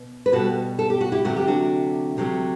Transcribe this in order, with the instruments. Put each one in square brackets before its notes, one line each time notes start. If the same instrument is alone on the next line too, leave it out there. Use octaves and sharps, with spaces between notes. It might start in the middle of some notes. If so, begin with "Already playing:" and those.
Already playing: [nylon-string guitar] B2
B4
B2 G3 F#4 A4
A4
G4
F#4
E4 G4
D2 C3 F#3 A3 F#4
G4
D4 F#4
D2 C3 F#3 A3